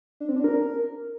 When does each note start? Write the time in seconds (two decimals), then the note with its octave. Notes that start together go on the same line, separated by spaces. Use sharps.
0.20 D4
0.28 C4
0.36 D4
0.44 A#4